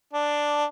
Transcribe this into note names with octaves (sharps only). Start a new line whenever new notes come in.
D4